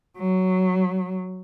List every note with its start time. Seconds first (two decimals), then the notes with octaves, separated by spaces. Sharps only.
0.18 F#3